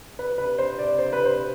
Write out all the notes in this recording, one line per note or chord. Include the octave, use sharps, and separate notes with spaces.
B4
B4
C5
D5
C5
B4
C5